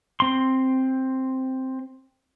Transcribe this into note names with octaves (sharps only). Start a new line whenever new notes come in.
C4 C6